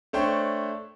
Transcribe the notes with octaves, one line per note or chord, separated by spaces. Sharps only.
A3 D4 C5 C#5 G5